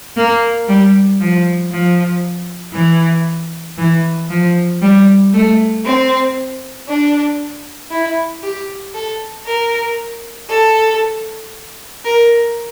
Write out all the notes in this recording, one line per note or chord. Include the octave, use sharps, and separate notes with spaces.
A#3
G3
F3
F3
E3
E3
F3
G3
A3
C4
D4
E4
G4
A4
A#4
A4
A#4